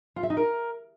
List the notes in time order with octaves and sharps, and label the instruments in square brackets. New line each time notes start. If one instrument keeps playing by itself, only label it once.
[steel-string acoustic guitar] F4
E5
D#4
A#4